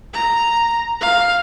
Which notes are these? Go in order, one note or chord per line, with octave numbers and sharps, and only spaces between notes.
A#5
F5